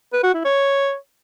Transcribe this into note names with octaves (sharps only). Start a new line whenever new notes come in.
B4
F#4
E4
C#5